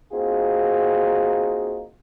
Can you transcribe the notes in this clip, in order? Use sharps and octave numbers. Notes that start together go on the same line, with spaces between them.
A#3 C4 D#4 F4 F#4 G#4